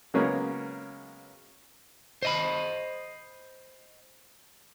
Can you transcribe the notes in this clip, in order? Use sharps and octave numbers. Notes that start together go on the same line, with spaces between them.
C#3 F#3 G#3 A#3 B3 C#4
C5 D#5 B5